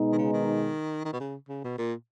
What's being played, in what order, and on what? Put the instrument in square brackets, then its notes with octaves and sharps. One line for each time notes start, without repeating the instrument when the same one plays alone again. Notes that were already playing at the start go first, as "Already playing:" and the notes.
Already playing: [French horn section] B2 G#3 B3 D#4
[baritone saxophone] D#3
C#3
D#3
D#3
B2
C#3
C#3
B2
A#2